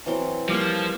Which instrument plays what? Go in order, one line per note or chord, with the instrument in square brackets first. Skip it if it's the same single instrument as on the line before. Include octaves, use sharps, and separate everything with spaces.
[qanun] E3 F#3 C4
[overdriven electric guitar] F3 [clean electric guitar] G3 A#3